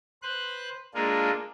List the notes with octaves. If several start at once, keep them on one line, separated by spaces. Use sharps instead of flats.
B4 C5 F#6
G#3 A#3 D4 F4 G#4 A4